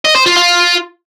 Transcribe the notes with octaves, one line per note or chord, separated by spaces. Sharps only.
D#5
C5
F4
F4